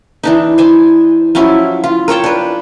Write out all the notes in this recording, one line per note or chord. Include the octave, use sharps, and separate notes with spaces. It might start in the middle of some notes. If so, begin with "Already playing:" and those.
E3 D4 D#4
C5 G#5 A5
F3 F#3 C#4 E4
F4
A#4 C#5 G5 A5
D4 B4